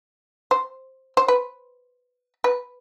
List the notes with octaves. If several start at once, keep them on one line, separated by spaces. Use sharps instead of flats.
C5
C5
B4
B4